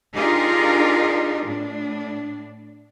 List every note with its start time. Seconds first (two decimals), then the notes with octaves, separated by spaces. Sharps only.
0.15 D4 D#4 F4 G4 G#4 A#4
1.45 A2 D4